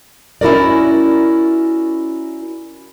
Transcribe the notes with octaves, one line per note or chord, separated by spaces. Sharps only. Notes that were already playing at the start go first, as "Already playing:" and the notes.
C#4 E4 F#4 A#4 D5